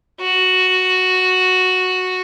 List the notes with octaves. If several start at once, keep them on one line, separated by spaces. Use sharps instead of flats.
F#4